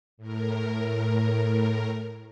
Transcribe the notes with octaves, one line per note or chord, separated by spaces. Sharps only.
A2 A#4